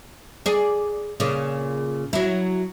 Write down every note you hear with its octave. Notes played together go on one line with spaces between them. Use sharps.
G#4 D5
A#2 C#3
F#3 E4